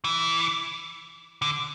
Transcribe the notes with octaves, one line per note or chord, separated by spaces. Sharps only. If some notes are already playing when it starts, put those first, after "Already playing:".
E3
D3